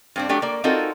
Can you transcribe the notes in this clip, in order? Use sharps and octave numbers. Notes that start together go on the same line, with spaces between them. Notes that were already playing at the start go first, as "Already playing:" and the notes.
G2 C4 D4
F#3 A3 D4 G4
A#3 D5
C4 D#4 F4 F#4 A4 A#4